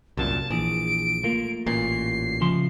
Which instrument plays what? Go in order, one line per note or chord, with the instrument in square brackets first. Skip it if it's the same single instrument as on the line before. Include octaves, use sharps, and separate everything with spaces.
[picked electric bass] C2 F#2 A#2 [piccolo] A5
[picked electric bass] A#1 [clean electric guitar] E3 G#4 [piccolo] D7
[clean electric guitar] A3 A#3 F4
[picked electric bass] A1 A#2 [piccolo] C7
[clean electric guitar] C#3 F3 C6